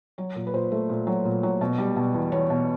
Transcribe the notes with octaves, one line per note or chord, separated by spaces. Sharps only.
F#3 C#5
A#2
B4
A#2 C5
A3
A#2
F#3
A#2
F#3
B2
G3
B2
E2
E2 C#5
B2